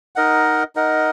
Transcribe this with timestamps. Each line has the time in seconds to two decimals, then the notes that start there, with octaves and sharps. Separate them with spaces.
0.16 D#4 A#4 D#5 F#5
0.76 D#4 A#4 D#5 F#5